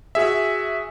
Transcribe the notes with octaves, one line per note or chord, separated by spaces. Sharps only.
F#4 G#4 E5